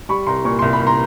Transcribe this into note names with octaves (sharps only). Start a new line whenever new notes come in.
G3 B5 C#6
C2 A#5 C6
A#2 C#6
C2 C6
B5
C2
A#5 C6